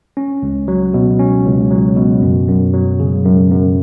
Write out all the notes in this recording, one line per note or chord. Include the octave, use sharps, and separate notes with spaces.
C#4
C#2
F#3
B2
C#4
C#2
F#3
B2
F#2
F#2
F#3
C#3
F#2
F#2